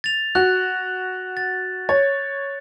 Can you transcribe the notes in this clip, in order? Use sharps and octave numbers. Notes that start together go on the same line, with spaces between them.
A6 F7
F#4 F#6
A6
C#5 A6